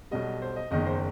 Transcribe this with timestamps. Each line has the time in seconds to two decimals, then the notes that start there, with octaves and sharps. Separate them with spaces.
0.11 B1 B2 G3 D#5
0.42 C5
0.56 D#5
0.71 F#1 E2 D#3 D#5
0.86 C5